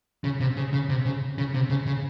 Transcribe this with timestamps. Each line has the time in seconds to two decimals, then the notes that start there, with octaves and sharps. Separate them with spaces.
0.24 C#3
0.41 C3
0.57 C#3
0.73 C#3
0.90 C3
1.05 C#3
1.38 C#3
1.54 C3
1.70 C#3
1.86 C#3